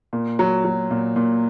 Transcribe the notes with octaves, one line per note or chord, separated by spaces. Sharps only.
A#2
F#3
F#3
A#2
A#2